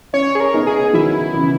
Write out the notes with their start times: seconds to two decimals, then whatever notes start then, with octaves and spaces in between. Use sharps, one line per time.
0.13 C#4 E4 C#5
0.35 G#4
0.40 A#4
0.54 B3 D#4
0.67 G#4
0.93 D#3 F#3 E4
1.34 C#3 E3